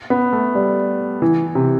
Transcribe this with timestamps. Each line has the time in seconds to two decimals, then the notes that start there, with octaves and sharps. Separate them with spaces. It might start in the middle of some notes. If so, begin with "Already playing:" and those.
0.10 B3
0.33 A3
0.55 G3
1.22 E3
1.55 C3